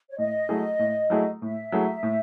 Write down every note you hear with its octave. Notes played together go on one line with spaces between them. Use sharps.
C#5
A2 D#5
F#3 A3 E4 G#4
A2
F#3 A3 E4 G#4
A2 E5
F#3 A3 E4 G#4
A2